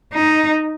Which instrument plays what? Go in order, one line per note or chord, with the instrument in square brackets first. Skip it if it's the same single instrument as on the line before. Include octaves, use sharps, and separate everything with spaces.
[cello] D#4